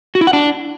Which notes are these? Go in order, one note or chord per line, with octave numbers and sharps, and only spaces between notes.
F#4
E4
F#5
D4